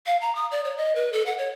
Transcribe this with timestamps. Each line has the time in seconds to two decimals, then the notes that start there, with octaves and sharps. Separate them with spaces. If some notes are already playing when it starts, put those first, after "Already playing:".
0.06 F5
0.21 A#5
0.35 D#6
0.51 D5
0.64 C#5
0.77 D#5
0.95 B4
1.12 A4
1.26 F#5
1.38 C#5